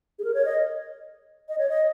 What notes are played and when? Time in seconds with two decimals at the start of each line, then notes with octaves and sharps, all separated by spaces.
0.19 G#4
0.24 A#4
0.34 C#5
0.45 D#5
1.49 D#5
1.58 C#5
1.69 D#5